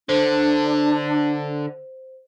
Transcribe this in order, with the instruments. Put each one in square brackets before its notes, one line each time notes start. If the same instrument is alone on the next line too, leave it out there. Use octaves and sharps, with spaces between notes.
[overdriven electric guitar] D3 [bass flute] D4 [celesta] C5